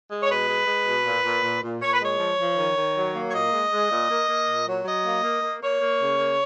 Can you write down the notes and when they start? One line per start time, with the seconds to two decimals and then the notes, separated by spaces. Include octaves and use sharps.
0.09 G#3
0.21 C#5
0.29 B2 B4
0.48 G#3
0.67 G#3
0.85 B2
1.05 A#2
1.24 A#2
1.42 A#2
1.62 A#2
1.81 A#2 C#5
1.92 B4
1.99 G#3 C#5
2.19 F3
2.37 F3
2.56 D#3
2.77 D#3
2.96 F#3
3.14 A#3
3.29 C#5
3.33 A#2 D#5
3.52 G#3
3.72 G#3
3.91 A#2
4.09 A#3
4.29 A#3
4.48 A#2
4.66 F#3
4.85 F#3 D#5
5.05 A#3
5.23 A#3
5.42 A#3
5.62 A#3 C#5
5.81 A#3
6.00 C#3
6.19 A#3